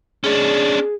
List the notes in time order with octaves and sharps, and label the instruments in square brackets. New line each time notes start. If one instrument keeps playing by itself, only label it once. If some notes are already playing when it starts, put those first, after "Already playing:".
[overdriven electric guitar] C#4 D4 [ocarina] G#4